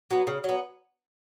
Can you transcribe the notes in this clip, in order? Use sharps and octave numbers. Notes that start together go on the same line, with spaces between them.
F#3 B3
C#3
F#3 B3